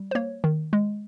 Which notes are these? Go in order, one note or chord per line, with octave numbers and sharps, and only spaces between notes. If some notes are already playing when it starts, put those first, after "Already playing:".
Already playing: G3
C5
A#3 C#5
D#3
G#3